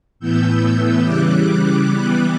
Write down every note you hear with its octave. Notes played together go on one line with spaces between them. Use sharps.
A2 E3 B3 E6 G6
C#3 E3 G3 D6 F#6
E3 G3 B3 D6 F#6